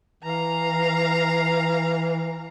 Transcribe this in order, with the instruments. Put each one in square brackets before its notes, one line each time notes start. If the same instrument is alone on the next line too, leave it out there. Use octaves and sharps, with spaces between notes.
[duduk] E3 [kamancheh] F5 A#5